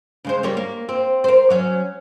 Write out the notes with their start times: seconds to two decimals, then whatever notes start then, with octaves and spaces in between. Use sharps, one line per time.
0.25 C#3 G#3 C5
0.43 G3 A#3 C#5
0.57 A#3
0.89 C4
1.24 A#4 C5
1.50 F#3 C#4